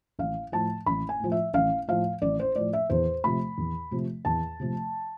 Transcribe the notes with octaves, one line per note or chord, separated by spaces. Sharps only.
A1 F5
A2 F3 A5
A1 B5
G#5
A2 F3
E5
A1 F5
A2 F3 F5
A1 D5
C5
A2 F3 D5
E5
E2 C5
C3 F3 A3 B5
E2
C3 F3 A3
E2 A5
C3 F3 A3